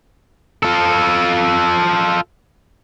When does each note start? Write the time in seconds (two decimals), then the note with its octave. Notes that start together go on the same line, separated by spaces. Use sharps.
0.63 F4 A4